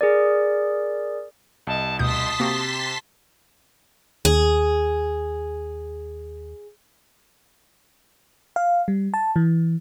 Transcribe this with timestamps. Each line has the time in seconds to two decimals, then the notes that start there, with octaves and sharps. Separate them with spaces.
0.01 G#4 A#4 D5
1.67 C2 D#5 A5
1.99 D2 B2 A5 C6 D#6 G6 B6
2.40 C3 A#3 F#4 G4
4.25 D#2 G#4
8.56 F5
8.88 G3
9.14 A5
9.36 E3